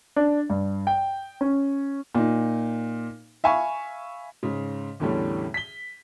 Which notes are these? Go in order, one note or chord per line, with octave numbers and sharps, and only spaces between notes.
D4
G2
G5
C#4
A#2 D#4
E5 F5 G#5 B5 C#6
G#2 C#3
E2 A2 D3 E3 G3 C#4
B6 G7